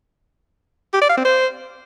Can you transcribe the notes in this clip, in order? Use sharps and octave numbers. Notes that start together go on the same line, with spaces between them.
G4
D5
F5
C4
C5